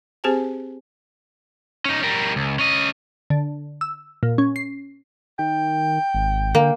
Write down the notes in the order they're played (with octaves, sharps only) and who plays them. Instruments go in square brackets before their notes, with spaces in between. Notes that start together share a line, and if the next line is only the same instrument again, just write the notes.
[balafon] C4 G4 G#4 C5 G#5 A5
[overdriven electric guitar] C#4 D#4
G3 A#4
C#2
C#4 D#5
[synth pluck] D3
E6
A#2
C#4
C7
[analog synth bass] D#3 [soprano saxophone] G5
[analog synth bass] G#1
[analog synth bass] D3 [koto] A#3